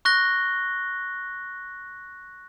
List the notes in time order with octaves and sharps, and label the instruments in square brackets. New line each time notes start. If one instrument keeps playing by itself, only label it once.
[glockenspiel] C#6 F#6 A#6 G7